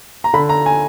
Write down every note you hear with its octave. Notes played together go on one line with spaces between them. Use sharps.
A#5
D3 B5
A#5
G#5